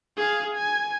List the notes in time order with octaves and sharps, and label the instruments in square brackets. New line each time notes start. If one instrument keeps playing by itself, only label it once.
[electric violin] G#4 F5
G#5